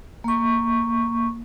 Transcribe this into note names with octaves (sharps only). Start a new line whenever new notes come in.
A#3 C#6